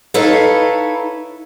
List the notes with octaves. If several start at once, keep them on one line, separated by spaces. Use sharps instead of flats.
D#4 E4 A4 B4 C#5 F5